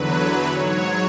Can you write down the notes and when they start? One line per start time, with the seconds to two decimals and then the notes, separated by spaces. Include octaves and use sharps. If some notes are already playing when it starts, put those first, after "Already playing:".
Already playing: E2 D3 F#3 B4
0.46 G#2 F#3 C#5